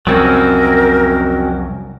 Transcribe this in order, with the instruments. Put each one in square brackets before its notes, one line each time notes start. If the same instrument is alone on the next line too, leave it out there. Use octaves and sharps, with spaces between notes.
[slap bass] C2 F2 [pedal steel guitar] F#3 C4 C#4 [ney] A#4